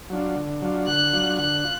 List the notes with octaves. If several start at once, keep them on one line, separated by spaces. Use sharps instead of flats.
F#3 D4 F4
D3
F#3 D4 F4
D3 F#6
F#3 D4 F4
D3 F#6
F4